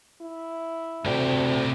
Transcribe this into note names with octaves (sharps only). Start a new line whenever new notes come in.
E4
D2 A2 C3 G4